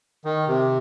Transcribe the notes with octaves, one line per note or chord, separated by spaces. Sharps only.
D#3
C3